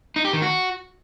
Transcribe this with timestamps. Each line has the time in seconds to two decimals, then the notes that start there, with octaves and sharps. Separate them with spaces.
0.16 D#4
0.25 G4
0.33 D#3
0.42 F#4